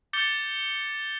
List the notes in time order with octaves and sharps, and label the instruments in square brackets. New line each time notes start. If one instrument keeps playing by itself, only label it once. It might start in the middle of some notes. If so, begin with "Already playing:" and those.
[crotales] D6 G6 A6 C#7 G7